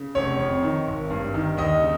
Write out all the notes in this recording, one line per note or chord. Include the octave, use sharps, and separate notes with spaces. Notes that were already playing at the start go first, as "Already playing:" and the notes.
Already playing: C#3
F1 C#5
F2
D#3
G#1
G2
D#3
D#2 D#5
C#3